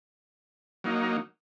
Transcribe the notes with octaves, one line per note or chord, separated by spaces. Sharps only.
F#3 A#3 D#4